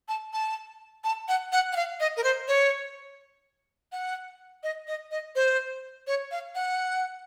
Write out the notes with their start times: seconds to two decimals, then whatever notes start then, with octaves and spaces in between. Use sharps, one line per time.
0.08 A5
0.33 A5
1.04 A5
1.28 F#5
1.52 F#5
1.72 F#5
1.76 F5
2.00 D#5
2.17 A#4
2.24 C5
2.48 C#5
3.92 F#5
4.63 D#5
4.87 D#5
5.11 D#5
5.36 C5
6.07 C#5
6.31 F5
6.55 F#5